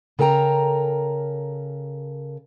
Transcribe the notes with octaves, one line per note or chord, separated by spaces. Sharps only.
C#3 A4 A#4 G5 A#5